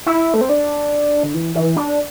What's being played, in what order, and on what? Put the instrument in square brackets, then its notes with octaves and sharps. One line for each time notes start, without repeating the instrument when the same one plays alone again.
[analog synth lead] E4
A3
C4
D4
D3
E3
E3
D4